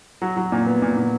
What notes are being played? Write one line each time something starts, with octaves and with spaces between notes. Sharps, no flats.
F#3
F#3
A#2
B3
A#2
A#2